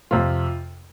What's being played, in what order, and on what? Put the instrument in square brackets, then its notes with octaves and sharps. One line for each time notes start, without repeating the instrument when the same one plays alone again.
[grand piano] F2 C3 F3 F4